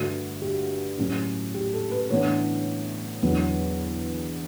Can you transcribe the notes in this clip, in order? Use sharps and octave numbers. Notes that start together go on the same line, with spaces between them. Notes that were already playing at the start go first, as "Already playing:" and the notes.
Already playing: G2 D3 A3 F#4
G4
A2 F#3 C#4
G4
A4
B4
A2 E3 B3 D4 C#5
E2 D3 F#3 B3